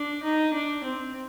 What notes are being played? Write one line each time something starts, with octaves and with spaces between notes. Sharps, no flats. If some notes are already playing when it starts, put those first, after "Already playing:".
Already playing: D4
D#4
D4
C4